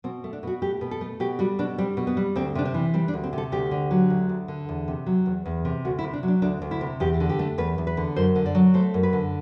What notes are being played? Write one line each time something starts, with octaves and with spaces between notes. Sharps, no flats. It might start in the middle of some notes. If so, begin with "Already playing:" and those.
B2 C4
A3
D4
B2 F#4
A3 G4
B2
A4
A3
B2 G4
G3 F#4
B2 D4
G3 C4
B2
B3
G3
D2 C4
C3 D4
C4
E3
G3 C4
D4
D2
C4
C3 A4
D2 G4
D3
F#3
D2
D2
D3
E2
C3
F#3
E2
E2
C3
D2 F#4
E4
C3
D4
F#3
D4
D2 D4
D2
E4
C3
E2 G4
D3
G4
A3
E2 B4
E2
B4
D3
F#2 C5
D3
D5
F#3
A3 C5
F#2
B4
D3